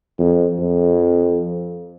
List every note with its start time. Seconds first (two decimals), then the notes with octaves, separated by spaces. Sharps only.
0.19 F2
0.59 F2